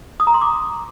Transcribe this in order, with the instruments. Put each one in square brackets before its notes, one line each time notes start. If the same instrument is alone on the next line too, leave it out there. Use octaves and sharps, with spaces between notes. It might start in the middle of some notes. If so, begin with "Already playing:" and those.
[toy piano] D#6
A#5
C6
D6